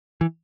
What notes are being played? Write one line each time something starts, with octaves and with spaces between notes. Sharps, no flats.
E3